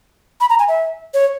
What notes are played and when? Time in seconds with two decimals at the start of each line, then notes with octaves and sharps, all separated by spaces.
0.41 B5
0.50 A#5
0.59 G#5
0.68 E5
1.14 C#5